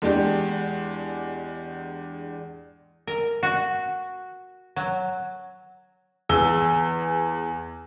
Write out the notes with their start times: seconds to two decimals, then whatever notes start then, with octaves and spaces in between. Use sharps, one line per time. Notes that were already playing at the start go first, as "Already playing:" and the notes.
0.02 E2 G#3 D4 G4
3.07 A#4
3.43 F#4
4.76 F#3
6.29 E2 G#4 E6 G7